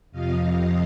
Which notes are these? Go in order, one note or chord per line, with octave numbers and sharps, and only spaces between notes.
F2 C3 F3 D#5 F5